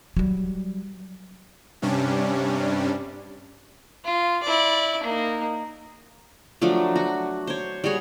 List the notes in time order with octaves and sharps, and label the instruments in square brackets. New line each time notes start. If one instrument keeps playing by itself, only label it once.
[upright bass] F#3 G3
[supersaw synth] G2 C3 G3 C#4 D4
[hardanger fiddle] F4
E4 D5
A#3 D#4
[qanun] F3 F#3 A3 D4
F#4
C5 C#5
G3 F#4 G#4 C#5